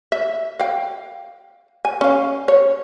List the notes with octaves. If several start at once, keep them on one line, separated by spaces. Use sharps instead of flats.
E5
F5 G5
G#5
C#4 F5
C#5